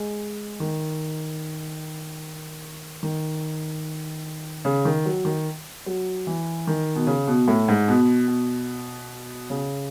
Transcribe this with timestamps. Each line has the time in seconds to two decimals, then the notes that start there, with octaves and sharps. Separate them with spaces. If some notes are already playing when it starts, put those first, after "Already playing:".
Already playing: G#3
0.60 D#3
3.03 D#3
4.65 C#3
4.85 D#3
5.05 F#3
5.25 D#3
5.86 F#3
6.27 E3
6.67 D#3
6.95 B2
7.07 C#3
7.27 B2
7.48 A2
7.68 G#2
7.88 B2
8.28 B2
9.50 C#3